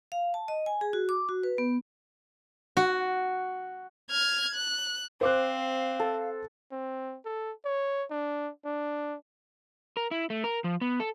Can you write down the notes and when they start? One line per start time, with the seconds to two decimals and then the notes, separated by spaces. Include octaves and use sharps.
0.12 F5
0.34 A5
0.48 D#5
0.66 G#5
0.81 G#4
0.93 F#4
1.09 D6
1.29 F#4
1.43 B4
1.58 B3
2.77 F#4
4.10 F6 G#6
4.55 F#6
5.21 C4 C5 F5 D6 F#6
6.00 A4
6.72 C4
7.25 A4
7.65 C#5
8.11 D4
8.65 D4
9.97 A#4
10.11 E4
10.30 A3
10.44 A#4
10.64 F3
10.81 B3
11.00 A4